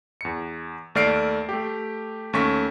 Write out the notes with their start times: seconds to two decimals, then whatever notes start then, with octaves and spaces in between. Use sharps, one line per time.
0.21 E2 C#7
0.95 D#2 A3 D5 F6 C7 D7
1.49 A3 G4
2.33 D#2 A3 C#4 C#6 B6